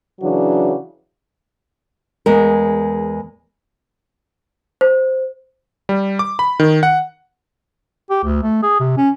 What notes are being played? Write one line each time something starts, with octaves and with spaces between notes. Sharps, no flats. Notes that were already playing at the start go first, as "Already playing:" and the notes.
C#3 E3 F#3 D4 F#4 G#4
E2 G#3 A#4
C5
G3
D6
B5
D#3
F#5
G4
D2
A3
G#4
C3
C#4